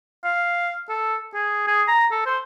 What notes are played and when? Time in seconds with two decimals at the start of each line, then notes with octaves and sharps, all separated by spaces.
0.24 F5
0.89 A4
1.34 G#4
1.67 G#4
1.88 A#5
2.11 A4
2.26 C5